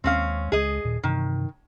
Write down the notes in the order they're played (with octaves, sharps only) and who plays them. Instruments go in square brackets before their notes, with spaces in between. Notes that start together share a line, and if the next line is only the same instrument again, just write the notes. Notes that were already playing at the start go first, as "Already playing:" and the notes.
[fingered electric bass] D#2 G#3 [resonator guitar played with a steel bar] C4 C#4 F5
[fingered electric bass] C#2 G#3 [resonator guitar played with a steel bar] G#4 D#5
[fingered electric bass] D#1 D#2 A#2
[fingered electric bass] G2 C3 E3 [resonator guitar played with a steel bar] D#3